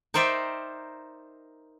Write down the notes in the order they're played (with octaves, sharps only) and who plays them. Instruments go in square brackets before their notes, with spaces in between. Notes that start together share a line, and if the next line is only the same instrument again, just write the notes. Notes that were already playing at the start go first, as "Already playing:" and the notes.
[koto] D#4 A#4 C5 D5 E5 G5